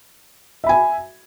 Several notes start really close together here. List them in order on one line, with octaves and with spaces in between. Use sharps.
E5 B5 G#5